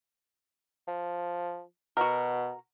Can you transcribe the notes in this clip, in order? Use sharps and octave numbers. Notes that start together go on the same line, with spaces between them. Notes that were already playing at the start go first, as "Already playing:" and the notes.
F3
B2 F#4 A#4